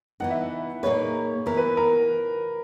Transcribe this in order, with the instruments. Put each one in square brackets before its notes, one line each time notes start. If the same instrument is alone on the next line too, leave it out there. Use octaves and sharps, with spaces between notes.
[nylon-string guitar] E3 B3 D#4 [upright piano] F#5
[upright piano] E5
[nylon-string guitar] A#2 A#3 D#4 G#4 B4 [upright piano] C#5
[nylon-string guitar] E3 B3 E4 [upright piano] A#4
[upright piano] B4
A#4